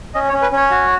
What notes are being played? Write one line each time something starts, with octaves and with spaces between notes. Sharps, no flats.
C#4 D#5
C#5
C#4
B4
C#4 C#5
F#4